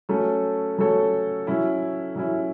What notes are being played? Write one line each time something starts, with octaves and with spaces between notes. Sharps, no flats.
F#3 A3 C#4 A4 C#5
F#3 A3 C#4 A4 C#5
F#3 C#4 E4
F#3 C#4 E4